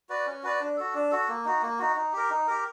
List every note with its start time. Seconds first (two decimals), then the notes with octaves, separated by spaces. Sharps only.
0.09 F#4 B4 D5
0.26 C#4
0.43 F#4 B4 D5
0.60 D4
0.77 F#4 A4
0.94 D4
1.11 F#4 A4
1.29 A#3
1.45 D#4 F#4
1.62 A#3
1.79 D#4 F#4
1.96 D#4
2.13 G4 A#4
2.30 D#4
2.47 G4 A#4